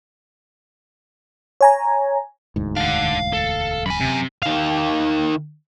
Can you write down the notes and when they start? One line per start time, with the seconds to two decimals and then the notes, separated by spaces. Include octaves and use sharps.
1.61 C#5 G#5 A#5
2.56 E1 D2 G#2
2.77 D4 F5 F#5
3.33 A4
3.86 F#2 G#5 B5
4.01 C3
4.43 D#3 F5